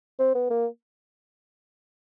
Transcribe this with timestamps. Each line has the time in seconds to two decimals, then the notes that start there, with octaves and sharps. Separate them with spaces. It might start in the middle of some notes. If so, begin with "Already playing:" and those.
0.19 C4
0.35 B3
0.50 A#3